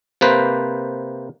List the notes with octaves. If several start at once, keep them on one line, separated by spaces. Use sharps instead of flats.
C3 A#3 B4 C5